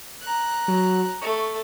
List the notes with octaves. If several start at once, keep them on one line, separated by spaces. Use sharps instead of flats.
A#5 F#6
F#3
A3 C#6